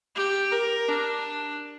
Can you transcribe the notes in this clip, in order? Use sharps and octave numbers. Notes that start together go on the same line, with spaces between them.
G4
A#4
D4